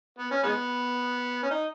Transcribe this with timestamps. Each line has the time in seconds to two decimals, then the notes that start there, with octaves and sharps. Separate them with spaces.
0.19 B3
0.31 C#4
0.44 G#3 B3
1.43 C#4
1.51 D#4